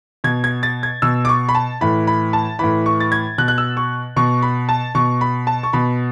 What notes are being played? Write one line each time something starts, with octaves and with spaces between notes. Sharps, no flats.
B2 G#6
G#6
A6
G#6
B2 E6
D6
C#6
B5
A5
A2 E3 B5
B5
A5
A2 E3 B5
C#6
A6
G#6
B2 F#6
F#6
E6
C#6
B2 C#6
B5
A5
B2 C#6
B5
A5
C#6
B2 B5